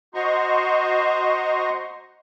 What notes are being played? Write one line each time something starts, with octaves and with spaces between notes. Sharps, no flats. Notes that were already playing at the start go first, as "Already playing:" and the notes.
F#4 C5 D#5 A#5 C6 C#6